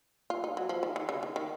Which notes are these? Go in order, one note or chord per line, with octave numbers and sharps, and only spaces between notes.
F4
D#4
F#3
F3
D#3
D#3
C#3
D#3
D#3